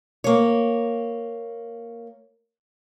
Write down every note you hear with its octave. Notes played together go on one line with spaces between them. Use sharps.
A#3 C#5